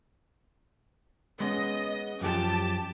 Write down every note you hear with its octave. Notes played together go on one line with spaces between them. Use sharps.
G#3 B3 C#4 D#5
F#2 F3 G4 A5